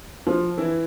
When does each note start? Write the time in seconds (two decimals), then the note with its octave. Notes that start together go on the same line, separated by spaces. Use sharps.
0.27 F3 F4
0.57 E3 E4